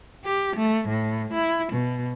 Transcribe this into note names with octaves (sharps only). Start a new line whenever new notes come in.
G4
A3
A2
E4
B2